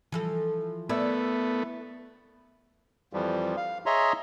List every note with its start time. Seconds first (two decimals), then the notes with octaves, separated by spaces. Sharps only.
0.12 E3 F3 A4
0.89 A3 B3 E4 D5
3.13 F2 E3 F3 G3
3.57 F5
3.86 G#4 C#5 D#5 E5 A#5 C6